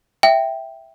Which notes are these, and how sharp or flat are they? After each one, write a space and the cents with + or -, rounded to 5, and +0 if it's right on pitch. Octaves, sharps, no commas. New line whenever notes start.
E5 +0 G5 +0